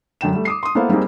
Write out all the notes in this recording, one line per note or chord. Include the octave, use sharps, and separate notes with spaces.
F#2 D3 G5 E7
G3 A3
D6 D#6 C7
C6 D#6
A#3 B3 E4 A4 C5 F5
G3 A#3 C4 D#4 G#4